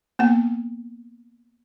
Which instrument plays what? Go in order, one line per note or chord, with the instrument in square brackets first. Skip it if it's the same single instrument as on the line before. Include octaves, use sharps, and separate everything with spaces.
[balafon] A#3 B3 F#5